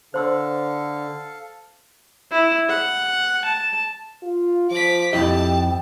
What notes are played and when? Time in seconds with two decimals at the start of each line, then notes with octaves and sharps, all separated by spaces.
0.14 D3 A4 C5 F5 C6 E6
2.32 E4
2.69 F#5
3.45 A5
4.23 F4
4.71 F3 D6 B6
5.13 F2 E4 G4 D#5 G5 A5